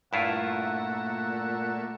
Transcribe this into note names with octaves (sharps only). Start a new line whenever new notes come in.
G2 A#2 A3 A#3 E4 F4 E5 F#5